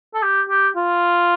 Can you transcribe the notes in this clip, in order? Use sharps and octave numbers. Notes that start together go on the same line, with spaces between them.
A4
G4
G4
F4